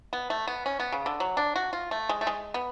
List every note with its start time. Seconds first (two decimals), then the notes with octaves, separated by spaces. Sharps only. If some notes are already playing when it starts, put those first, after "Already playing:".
0.13 B3
0.30 A3
0.47 B3
0.66 C#4
0.80 B3
0.92 C#3
1.06 D3
1.20 F#3
1.37 D4
1.56 F#4
1.73 F4
1.91 A3
2.09 G#3
2.21 A3
2.27 G#3
2.54 B3